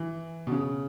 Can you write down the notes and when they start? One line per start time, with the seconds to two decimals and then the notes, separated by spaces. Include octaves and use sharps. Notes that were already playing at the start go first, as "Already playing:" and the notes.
Already playing: E3
0.47 B2
0.52 C#3